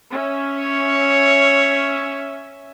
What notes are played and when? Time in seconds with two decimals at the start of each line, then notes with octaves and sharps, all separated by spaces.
0.11 C#4 E5
0.59 C#5